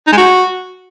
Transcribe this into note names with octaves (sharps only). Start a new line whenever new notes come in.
D#4
G#3
F#4